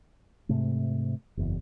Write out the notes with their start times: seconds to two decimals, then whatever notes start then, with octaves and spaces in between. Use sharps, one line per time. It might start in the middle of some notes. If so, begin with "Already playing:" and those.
0.49 G#2 C3 A3
1.37 F#1 E2